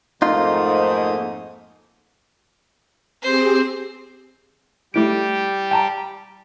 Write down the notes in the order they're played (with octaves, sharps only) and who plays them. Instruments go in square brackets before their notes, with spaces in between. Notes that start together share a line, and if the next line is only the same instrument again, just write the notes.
[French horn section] F2 G#2 [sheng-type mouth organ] A3 A#3 D#6 [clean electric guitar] D#4 F4
[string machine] C4 G4 G#4 [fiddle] C5
[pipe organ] G3 G4 [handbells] A3 E4 D7
[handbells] G5 A5 A#5